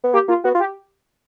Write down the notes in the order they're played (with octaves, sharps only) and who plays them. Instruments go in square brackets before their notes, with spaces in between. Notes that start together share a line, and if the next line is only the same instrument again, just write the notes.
[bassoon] B3
[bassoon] A#3 [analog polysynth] G4
[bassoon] A#3 [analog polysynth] F4
[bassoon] B3 [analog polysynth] F#4
[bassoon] F4
[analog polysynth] G4